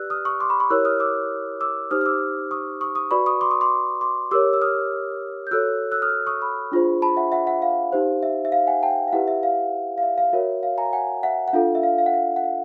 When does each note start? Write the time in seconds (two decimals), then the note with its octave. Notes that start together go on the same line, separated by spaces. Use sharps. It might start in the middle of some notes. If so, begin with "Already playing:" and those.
Already playing: G4 B4 D5 E6 F#6
0.10 D#6 F6
0.25 C#6 D#6
0.40 C6 D6
0.50 B5 C#6
0.60 B5 C#6
0.70 E4 G4 A#4 C#5 E6 F#6
0.85 D#6 F6
1.00 D6 E6
1.61 D6 E6
1.91 D#4 G4 C5 D#6 F6
2.01 F6
2.06 D6 E6
2.51 C#6 D#6
2.81 C#6 D#6
2.95 C#6 D#6
3.11 F#4 B4 D5 B5 C#6
3.26 C#6 D#6
3.41 C6 D6
3.51 C#6 D#6
3.61 C6 D6
4.01 C6 D6
4.31 G4 A#4 C#5 D6 E6
4.53 E6
4.62 D#6 F6
5.47 G6
5.51 F#4 A4 C#5 E6 F#6
5.91 E6 F#6
6.02 D#6 F6
6.27 C#6 D#6
6.42 B5 C#6
6.72 D4 F4 G#4 C5
7.02 A5 B5
7.17 E5 F#5
7.32 E5 F#5
7.47 E5 F#5
7.62 F5
7.92 D#4 G4 C5
8.23 E5
8.45 E5
8.52 F5
8.67 F#5 G#5
8.83 G5 A5
9.08 F5
9.13 E4 G4 B4 E5 F#5
9.28 E5
9.43 F5
9.98 F5
10.03 E5
10.18 F5
10.33 F#4 A#4 C#5 E5
10.63 F5
10.78 G#5 A#5
10.93 F#5 G#5
11.23 E5 F#5
11.48 F#5
11.53 D4 F4 A4 F5
11.75 E5
11.83 F5
11.98 F5
12.06 F#5
12.14 F5
12.36 F#5
12.43 F5